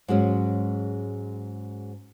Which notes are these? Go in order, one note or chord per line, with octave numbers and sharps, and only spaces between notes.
G#2 F#3 G#3 C#4